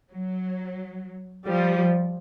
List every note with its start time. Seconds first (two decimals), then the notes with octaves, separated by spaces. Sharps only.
0.10 F#3
1.47 F3 G3